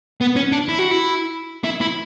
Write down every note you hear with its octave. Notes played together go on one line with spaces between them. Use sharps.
B3
C#4
D4
E4
F#4
E4
E4
E4